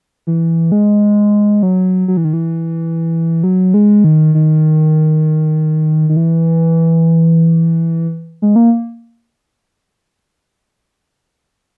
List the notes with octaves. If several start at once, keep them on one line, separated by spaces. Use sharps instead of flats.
E3
G#3
F#3
F#3
E3
D#3
E3
F#3
G#3
D#3
D#3
D#3
E3
G#3
A#3